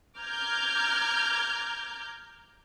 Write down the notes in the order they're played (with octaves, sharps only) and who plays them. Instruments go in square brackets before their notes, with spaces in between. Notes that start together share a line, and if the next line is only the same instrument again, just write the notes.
[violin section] A#5 D6 F6 G6 G#6